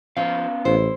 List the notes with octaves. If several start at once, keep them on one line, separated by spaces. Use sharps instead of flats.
F3 B3 C#4 F5
A1 E4 C5